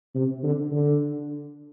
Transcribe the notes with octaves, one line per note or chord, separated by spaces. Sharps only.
C3
D3
D3